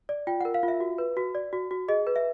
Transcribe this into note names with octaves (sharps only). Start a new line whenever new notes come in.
D5
F4 G5
F#5
A#4
F5
F4
E5
F#4
B4
F#4
D5
F#4
F#4
G#4 D#5
B4
E5